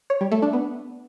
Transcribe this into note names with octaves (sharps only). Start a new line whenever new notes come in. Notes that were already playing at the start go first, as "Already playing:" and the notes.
C#5
G3
A3
D4
B3